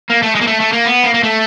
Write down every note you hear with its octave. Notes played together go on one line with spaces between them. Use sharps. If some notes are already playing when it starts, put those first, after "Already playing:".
A#3
A3
G#3
A#3
A3
A3
A#3
B3
A#3
A#3
A3